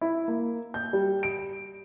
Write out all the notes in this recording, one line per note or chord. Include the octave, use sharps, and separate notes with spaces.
E4
A#3
G6
G3
D7